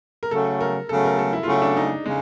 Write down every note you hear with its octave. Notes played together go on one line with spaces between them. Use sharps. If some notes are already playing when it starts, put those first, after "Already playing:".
A#4
C#3 F#3 A3 A4
A#4
C#3 F#3 A3 A4
A#4
A4
E4
F4
C#3 F#3 A3 E4
D4
D#4
C#3 G#3